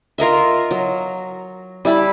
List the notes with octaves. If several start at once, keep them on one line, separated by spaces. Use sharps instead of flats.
F4 A#4 D#5 E5
F#3
G3 E4 A5 B5